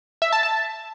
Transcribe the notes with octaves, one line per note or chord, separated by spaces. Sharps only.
E5
A5
A5